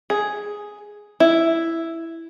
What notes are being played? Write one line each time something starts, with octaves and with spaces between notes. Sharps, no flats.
G#4
E4